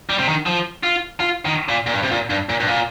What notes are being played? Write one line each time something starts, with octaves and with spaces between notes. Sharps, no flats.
G3
C3
D#3
F3
F4
F4
D#3
A#2
A#2
G2
C3
A#2
G2
A#2
G2
A#2